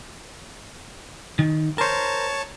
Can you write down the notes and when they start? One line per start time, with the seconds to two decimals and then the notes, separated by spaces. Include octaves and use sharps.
1.39 D#3
1.78 A#4 C5 C#5 A5